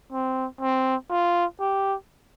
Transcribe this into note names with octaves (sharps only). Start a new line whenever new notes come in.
C4
C4
F4
G4